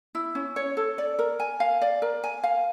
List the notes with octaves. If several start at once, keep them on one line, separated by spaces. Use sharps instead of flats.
E4
C#4
C#5
A4
D5
A#4
G#5
F5
D5
A#4
G#5
F5